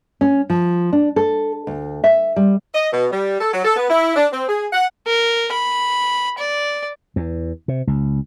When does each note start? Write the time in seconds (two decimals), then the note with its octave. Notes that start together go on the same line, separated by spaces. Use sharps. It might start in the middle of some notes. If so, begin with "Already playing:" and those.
0.21 C#4
0.50 F3
0.93 D4
1.16 A4
1.67 D2
2.04 E5
2.36 G3
2.74 D#5
2.92 B2
3.11 G3
3.40 A4
3.53 F#3
3.64 A4
3.76 B3
3.90 E4
4.16 D4
4.32 C4
4.48 G#4
4.73 F#5
5.07 A#4
5.52 B5
6.38 D5
7.16 E2
7.68 C3
7.87 C#2